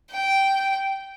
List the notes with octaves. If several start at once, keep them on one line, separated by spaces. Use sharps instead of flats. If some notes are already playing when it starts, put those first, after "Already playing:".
G5